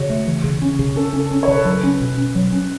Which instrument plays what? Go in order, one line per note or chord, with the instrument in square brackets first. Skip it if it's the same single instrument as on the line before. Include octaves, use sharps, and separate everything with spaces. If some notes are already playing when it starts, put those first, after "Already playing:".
Already playing: [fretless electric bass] C#3 [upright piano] F#4 C#5
[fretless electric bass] A3
E3
C#3
C#4
C#3
[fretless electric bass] C#4 [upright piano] A4
[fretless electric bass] C#4
[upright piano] A4
[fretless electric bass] C#4
[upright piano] C#5
[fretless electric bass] C#3 [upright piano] B4
[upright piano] A4
[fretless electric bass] F#3 [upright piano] B4
[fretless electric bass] C#4
B2
C#4
F#3
C#4